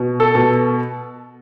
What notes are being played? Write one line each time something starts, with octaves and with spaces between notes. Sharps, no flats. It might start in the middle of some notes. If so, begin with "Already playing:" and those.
Already playing: B2
A4
B2